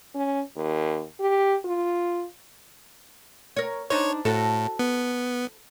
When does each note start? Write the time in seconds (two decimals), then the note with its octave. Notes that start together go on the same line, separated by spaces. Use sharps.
0.15 C#4
0.56 D#2
1.20 G4
1.65 F4
3.56 A#4 C#5
3.90 D4 D#4 C5 C#5
4.25 A2 F#4 A4
4.79 B3